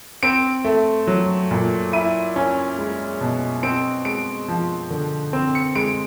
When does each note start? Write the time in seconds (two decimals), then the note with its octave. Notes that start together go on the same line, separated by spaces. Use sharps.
0.23 C4 D7
0.65 A3
1.07 F#3
1.51 A#2
1.93 E4 D#7
2.36 C#4
2.79 G#3
3.21 B2
3.63 C4 D7
4.05 G#3 D7
4.48 F3
4.90 D3
5.33 C4
5.55 C#7
5.75 G#3 D7